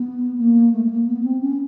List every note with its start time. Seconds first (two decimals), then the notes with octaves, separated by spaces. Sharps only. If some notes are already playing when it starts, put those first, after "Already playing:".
Already playing: B3
0.38 A#3
0.73 A3
0.85 A3
0.90 A#3
1.07 B3
1.23 C4
1.41 C#4